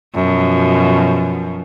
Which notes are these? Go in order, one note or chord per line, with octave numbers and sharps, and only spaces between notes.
F#2 B2 F3